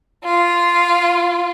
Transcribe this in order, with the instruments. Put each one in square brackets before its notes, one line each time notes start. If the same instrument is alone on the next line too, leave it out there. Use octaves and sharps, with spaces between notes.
[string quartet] F4